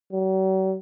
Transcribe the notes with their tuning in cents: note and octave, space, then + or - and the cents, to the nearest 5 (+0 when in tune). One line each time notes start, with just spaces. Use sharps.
F#3 +45